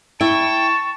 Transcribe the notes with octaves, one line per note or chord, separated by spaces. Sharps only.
E4 G5 A5 C#6